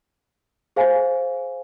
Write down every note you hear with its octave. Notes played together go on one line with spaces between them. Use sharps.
G#4 C5 F5 G#5